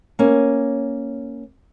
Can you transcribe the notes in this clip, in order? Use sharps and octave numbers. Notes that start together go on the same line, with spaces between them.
A#3 C#4